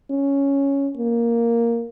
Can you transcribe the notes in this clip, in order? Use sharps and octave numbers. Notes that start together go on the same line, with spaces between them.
C#4
A#3